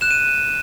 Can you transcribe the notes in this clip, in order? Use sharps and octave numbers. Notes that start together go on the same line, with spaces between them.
F#6 E7
D#7